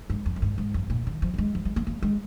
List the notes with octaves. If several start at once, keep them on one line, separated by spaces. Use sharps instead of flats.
G#2
F2
F2
G#2
G#2
F2
A#2
D#3
F3
F3
G#3
F3
G#3
A#3
A#3
G#3